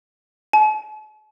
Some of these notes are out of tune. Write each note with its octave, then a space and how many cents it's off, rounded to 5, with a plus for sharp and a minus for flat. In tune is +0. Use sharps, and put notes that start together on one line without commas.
A5 -45